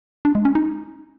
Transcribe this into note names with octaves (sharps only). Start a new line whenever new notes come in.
D4
G#3
C#4
D#4